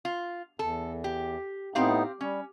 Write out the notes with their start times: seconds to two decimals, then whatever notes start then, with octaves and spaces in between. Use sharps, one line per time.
0.05 F4
0.59 E2 A4
1.04 G4
1.75 A2 B3 C4 D#4 G4 F5
2.21 G3 C#4